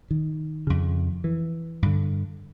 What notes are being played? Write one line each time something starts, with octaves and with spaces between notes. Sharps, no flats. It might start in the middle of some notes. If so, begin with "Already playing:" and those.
D#3
F2 C#3
E3
G2 D3